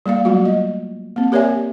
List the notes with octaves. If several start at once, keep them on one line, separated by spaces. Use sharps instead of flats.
G3 A#3 D5 F5
F#3 G3 A3 F4 F#4
D#5
A#3 C4
G4 A#4 C#5 D5 E5 G#5